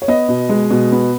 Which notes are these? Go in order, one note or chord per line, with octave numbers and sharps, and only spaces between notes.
C#5
B3 D#5
B2
G#3
B2
B3